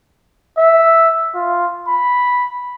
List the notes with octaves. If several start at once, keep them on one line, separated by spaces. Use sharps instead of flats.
E5
F4
B5